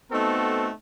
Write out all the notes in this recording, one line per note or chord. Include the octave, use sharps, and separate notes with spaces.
A3 B3 C4 D#4 F#4 A4